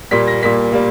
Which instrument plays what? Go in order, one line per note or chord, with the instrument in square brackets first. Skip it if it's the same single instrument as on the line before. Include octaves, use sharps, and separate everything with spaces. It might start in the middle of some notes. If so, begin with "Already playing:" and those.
[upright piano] A#2 G3 A#3 B6
A#6
A#2 G3 A#3 B6
G3 A#3